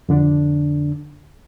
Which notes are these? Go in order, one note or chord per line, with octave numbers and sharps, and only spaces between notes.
F2 D3 D4